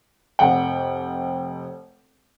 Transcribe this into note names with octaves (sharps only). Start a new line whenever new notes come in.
F1 F#5 G5